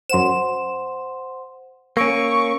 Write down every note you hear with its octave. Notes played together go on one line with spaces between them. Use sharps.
F#2 C5 F#5 C6 E7
A#3 C#4 C#6 E6 D7